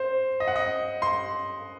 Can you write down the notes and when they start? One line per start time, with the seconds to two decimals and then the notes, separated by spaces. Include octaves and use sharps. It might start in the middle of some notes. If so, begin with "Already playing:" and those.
Already playing: C5
0.40 D#5
0.48 F#5
0.56 D#5
1.02 C6